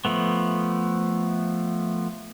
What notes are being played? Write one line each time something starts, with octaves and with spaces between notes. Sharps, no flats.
F3 A3 B3